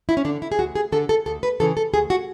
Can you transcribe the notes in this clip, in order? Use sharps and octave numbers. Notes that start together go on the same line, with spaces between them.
E4
C#4
D3 D4
E4
G#4
D2 F#4
G#4
D3 A4
A4
D2 A4
B4
C#3 E3 A4
A4
D2 G#4
F#4